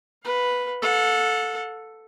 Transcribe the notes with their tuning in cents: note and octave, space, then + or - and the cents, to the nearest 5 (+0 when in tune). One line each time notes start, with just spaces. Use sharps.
B4 +0 F5 +35
A4 +0 F#5 -45